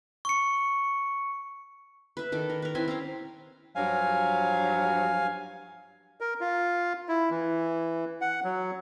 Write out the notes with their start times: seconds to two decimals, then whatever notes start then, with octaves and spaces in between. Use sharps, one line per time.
0.25 C#6 C#7
2.17 B4 E5
2.32 D#3 A4 D5
2.50 A#4
2.62 A#4 B4
2.75 C4 E4 E5 G#5
2.88 C4 C#4 F5
3.76 G2 F3 F#3 F5 G#5
6.21 A#4
6.41 F4
7.09 E4
7.30 E3
8.21 F#5
8.44 F#3